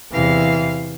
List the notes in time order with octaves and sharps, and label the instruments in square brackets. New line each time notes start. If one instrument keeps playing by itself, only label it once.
[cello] E2 F5 [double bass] C3 E3